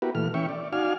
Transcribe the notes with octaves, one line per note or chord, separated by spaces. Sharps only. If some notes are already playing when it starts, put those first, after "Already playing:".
B3 E4 F#4 G4 A#4 B4
A#2 E3 A3 F6
E3 C#4 E5 G5 C#6
D5
D#4 F#4 D5 F5 G#5 F6